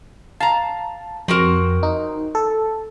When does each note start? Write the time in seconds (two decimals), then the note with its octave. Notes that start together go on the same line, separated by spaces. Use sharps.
0.40 F5 A5 A#5
1.28 F2 C4 F#4 A#4
1.83 D#4
2.35 A4